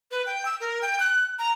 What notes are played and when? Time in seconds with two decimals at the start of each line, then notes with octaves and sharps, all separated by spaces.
0.11 B4
0.26 G5
0.46 E6
0.60 A#4
0.82 G5
1.00 F#6
1.39 A#5